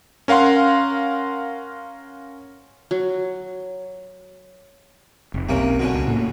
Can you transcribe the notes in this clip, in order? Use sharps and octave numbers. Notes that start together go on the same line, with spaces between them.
C#4 A#4 F5 F#5 C6
F#3
F1
B1 C3 A#3 C#4
B2 D3 C#4
C#2
A2 A#3